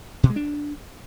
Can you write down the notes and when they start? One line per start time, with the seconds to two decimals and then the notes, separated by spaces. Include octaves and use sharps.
0.23 B2
0.30 G#3
0.36 D4